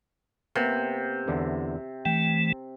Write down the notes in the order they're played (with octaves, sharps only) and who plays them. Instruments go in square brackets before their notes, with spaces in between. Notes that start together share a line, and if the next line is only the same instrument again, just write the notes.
[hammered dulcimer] C3 [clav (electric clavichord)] A#3 B3
[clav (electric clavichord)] E2 D3 E3
[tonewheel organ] E3 A3 [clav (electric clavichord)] G5